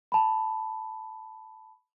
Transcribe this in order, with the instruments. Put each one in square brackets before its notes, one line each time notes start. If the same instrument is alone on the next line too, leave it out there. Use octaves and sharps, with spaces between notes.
[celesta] A5 B5